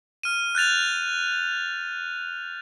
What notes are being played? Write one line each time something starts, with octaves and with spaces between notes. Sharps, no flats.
F6 D#7
F#6 G6 A6 F7